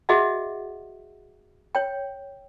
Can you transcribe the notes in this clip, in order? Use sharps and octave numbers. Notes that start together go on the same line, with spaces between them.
F#4 G#4 D#5 E5 F#5
C#5 G5